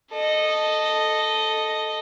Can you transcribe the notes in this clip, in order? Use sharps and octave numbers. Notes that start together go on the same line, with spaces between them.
A4 D#5